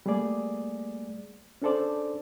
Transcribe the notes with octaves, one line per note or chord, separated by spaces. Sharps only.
G3 A3 A#3 G#4 D5
C#4 D4 G#4 A4 C5 D5